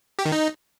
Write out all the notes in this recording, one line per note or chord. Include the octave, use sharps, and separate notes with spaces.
G4
D#3
D#4